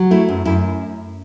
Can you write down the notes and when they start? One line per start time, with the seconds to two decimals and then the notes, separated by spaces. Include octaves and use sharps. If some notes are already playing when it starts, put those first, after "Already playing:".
Already playing: F#3
0.11 A3 E4
0.29 F#2
0.45 F#2 E4